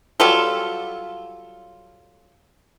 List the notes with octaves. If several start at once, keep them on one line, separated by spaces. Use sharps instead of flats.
F#3 G3 F4 A4